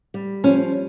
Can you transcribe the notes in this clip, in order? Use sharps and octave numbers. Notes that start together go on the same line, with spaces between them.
G3
F3 C#4